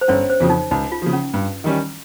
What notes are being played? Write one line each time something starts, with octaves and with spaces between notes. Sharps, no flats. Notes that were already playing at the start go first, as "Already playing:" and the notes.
C5
G1 C#4 C#5
C5
F2 C#3 F3
D#4
C#2 D#4
F4
C#3 F3
C#4
G2
D#3 G3 C#4